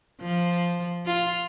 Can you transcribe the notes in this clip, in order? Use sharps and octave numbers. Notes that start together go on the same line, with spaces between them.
F3
F4